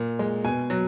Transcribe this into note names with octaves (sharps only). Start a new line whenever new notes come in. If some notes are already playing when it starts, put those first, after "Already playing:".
Already playing: A#2
G#3
B2 G#5
F#3